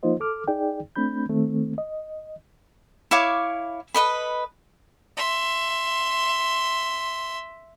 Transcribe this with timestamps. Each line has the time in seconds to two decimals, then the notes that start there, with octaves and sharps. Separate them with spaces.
0.03 F3 A#3 D#4 F4 C5 D#5
0.20 A4 D6 F6
0.48 D#4 G#4 D5 G5
0.96 A3 C4 D4 B5 G6
1.29 D#3 A3 C4
1.78 D#5
3.11 E4 C#5 F5 D6
3.94 A4 B4 D#5 B5
5.17 E5 C6